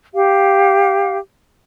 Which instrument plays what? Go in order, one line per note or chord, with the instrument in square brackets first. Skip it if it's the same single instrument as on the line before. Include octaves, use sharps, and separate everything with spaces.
[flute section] G4 F5